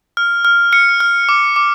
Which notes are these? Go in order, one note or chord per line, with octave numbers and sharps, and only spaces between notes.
F6
F6
F6 C#7
F6
D6
D6